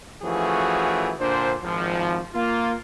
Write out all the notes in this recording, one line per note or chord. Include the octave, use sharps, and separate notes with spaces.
E3 F3 A3 C#4 F#4 G#4
A#2 D3 D4 C5
G#1 F3
A#3 F4